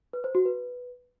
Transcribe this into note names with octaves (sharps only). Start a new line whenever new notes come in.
B4
C5
F#4
B4